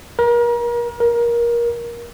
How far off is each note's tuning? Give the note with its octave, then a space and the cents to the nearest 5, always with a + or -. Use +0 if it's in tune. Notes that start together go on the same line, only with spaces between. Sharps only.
A#4 +35
A#4 +20